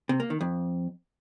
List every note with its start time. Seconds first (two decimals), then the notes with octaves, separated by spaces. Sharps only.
0.09 C3
0.20 A#3
0.30 D#3
0.41 F2